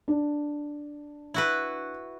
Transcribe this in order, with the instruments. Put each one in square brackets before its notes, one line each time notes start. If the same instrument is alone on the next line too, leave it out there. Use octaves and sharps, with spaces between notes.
[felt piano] D4
[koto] E4 F#4 B4